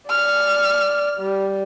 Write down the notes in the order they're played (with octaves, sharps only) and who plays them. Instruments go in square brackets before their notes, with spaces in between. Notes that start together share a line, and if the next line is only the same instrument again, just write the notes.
[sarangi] D5 [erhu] F6
[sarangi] G3